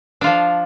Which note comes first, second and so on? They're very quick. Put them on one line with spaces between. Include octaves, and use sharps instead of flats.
D4 F4 F3